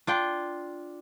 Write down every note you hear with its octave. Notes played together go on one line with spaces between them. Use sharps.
D4 F4 G5